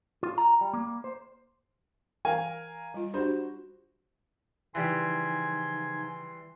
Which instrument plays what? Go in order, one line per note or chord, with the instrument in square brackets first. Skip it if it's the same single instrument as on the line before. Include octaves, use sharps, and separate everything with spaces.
[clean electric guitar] F4
A#5
G3
A#3
C5
[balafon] E3 [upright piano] A#4 F5 G#5
[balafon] G3 F4
[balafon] D4 G4 B5 [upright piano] F#4 C5
[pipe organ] C#3 F3 D#4 [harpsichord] E3 G3 [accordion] G#5 [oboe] C6